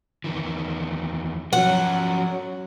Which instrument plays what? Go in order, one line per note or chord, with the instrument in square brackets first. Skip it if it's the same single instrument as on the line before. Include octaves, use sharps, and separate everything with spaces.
[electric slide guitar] E2 D#3 E3
[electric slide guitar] F3 C#4 [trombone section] F#3 [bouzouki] F#5